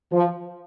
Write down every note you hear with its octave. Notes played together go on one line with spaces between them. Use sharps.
F3